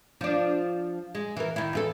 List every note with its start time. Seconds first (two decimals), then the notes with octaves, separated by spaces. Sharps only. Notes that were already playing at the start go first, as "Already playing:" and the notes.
0.21 F3 D4
1.15 G#3
1.37 E3 A#4
1.56 D#3 E4
1.73 E2 F4 A4